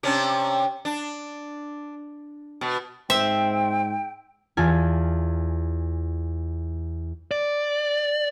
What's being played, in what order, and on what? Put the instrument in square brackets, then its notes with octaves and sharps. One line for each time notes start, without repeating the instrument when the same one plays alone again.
[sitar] C3 C#4 D4
D4
B2
[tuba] G#2 [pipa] C4 [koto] E5 [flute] G5
[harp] E2 F4 G#5 A5
[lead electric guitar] D5